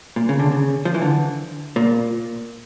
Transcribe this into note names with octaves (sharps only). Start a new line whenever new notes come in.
A#2
C#3
D3
C#3
F3
E3
D3
A#2